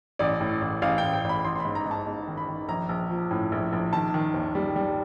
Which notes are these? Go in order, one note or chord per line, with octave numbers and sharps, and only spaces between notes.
A1 D5
A2
A1
A1 F5
G5
A1
G5
A1
B5
A1 C6
C6
B5
G#2
A#5
G#2
A5
G#2
D#3
B5
D#3
A#1 A#5
A#1
F3
A2
A#1
A#1
D#3 A5
D#3
D#2
G3
G3